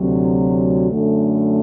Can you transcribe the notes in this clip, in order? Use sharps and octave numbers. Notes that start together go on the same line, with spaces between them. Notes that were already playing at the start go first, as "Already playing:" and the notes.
Already playing: D2 C3 F#3
F#2 D3 A3